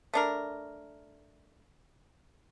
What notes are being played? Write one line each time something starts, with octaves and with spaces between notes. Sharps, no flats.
A3 D4 A#4